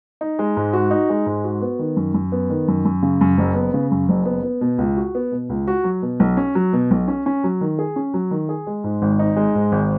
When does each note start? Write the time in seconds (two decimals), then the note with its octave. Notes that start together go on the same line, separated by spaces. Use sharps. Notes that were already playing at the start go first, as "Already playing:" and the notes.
0.21 D#4
0.39 G#3
0.57 G#2
0.73 F#4
0.91 D#4
1.09 G#3
1.26 G#2
1.44 F#4
1.62 B3
1.79 D#3
1.96 F#2
2.14 F#2
2.32 B3
2.50 D#3
2.68 F#2
2.85 F#2
3.03 C#3
3.21 F#2
3.38 F#1
3.55 B3
3.74 C#3
3.91 F#2
4.09 F#1
4.25 B3
4.43 B3
4.61 B2
4.78 C#2
4.97 F#4
5.15 B3
5.32 B2
5.50 C#2
5.67 F#4
5.84 F#3
6.02 B2
6.20 B1
6.37 C#4
6.55 F#3
6.73 B2
6.91 B1
7.08 C#4
7.26 C#4
7.44 F#3
7.61 D#3
7.79 G#4
7.96 C#4
8.14 F#3
8.31 D#3
8.49 G#4
8.67 G#3
8.84 G#2
9.02 G#1
9.19 D#4
9.36 G#3
9.55 G#2
9.72 G#1